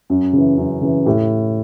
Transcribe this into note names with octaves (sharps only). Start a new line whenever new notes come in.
F#2
C#3 E3
F#2
C#3 E3
A2 G4